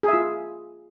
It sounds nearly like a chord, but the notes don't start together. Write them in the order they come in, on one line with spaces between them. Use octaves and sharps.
G#4 E5 F4